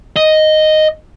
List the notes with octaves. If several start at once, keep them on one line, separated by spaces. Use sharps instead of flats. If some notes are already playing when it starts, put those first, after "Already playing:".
D#5